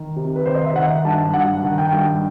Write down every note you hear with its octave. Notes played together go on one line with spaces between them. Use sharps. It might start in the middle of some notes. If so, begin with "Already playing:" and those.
Already playing: D#3
C3
B4
D#3 C5
D#5
E5
D#3 F#5
G2 A5
G2 F#5
D#3
G5
G2